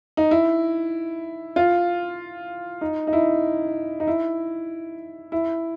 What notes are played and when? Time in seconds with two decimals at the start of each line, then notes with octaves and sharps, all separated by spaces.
0.17 D#4
0.31 E4
1.56 F4
2.81 D#4
3.07 D#4
3.13 E4
4.00 D#4
4.07 E4
5.32 E4